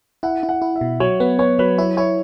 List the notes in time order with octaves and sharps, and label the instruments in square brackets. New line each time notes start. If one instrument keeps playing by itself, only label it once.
[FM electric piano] E4 [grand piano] F#5
[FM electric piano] E4
[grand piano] F#5
[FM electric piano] E4
[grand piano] E5
[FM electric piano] B2
[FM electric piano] F#3 [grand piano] C#5
[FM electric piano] B3 [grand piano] B4
[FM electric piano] B3 [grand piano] C#5
[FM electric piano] F#3 [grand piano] B4
[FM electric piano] E4 [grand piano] C#5
[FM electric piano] E4 [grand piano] C#5